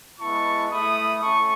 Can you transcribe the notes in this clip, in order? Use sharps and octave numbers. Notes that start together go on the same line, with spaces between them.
G#3 B3 E4 A5 C#6
A3 E4 B5 D#6
A3 C#4 A5 C#6